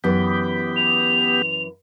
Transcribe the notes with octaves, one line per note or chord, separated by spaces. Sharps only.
F#2 E3 B3 G4
F7